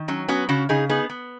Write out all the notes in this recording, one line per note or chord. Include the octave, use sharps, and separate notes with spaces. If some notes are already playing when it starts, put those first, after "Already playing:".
Already playing: D#3
F#3 C#4
B3 C#4 F#4
C#3 C#4 F#4
C#3 D#4 G#4
B3 D#4 G#4
B3